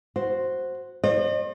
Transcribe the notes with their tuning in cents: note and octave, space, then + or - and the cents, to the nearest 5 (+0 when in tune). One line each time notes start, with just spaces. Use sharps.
F#4 +0 C5 +0
C5 +40 D#5 -45